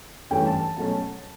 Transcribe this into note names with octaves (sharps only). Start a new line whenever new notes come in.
G2 E3 A3 C#4 G5
A5
B2 F#3 A3 C#4 A5